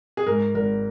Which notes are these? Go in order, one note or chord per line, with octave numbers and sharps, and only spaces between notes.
G#4
G#2 A#4
G#1 A#4